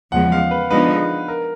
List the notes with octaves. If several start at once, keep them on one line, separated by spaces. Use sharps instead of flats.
E2 C#3 F3 G#3 B3 F#5
F5
B4
D3 F3 G#3 B3 D#4 B4
A#4